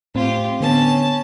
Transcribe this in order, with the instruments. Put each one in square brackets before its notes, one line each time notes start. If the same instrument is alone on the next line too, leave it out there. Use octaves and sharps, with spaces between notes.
[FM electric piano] A2 C4 [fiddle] F4 G4
[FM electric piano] D3 B3 [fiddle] C#4 A5